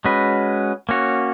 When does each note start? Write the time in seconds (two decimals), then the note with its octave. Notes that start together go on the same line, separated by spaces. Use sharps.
0.05 G#3 C#4 F#4 B4
0.89 A#3 C#4 F#4 C#5